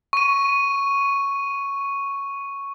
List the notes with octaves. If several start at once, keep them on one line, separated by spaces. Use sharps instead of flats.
C#6 D#7